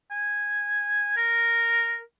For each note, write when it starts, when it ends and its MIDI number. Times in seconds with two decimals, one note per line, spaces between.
0.11 1.12 80
1.17 2.01 70